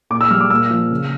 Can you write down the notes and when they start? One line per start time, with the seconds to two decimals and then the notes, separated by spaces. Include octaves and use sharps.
0.10 A#2 D6
0.21 E6
0.30 G3 F6
0.40 D6
0.50 A#2 E6
0.70 F3
0.91 C#3